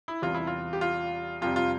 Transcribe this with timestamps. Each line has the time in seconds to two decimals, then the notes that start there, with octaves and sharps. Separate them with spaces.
0.08 E4
0.22 E2 C3 E3 G3 F4
0.34 E4
0.47 F4
0.73 G4
0.81 F4
1.41 F2 C3 G3 F4
1.56 F4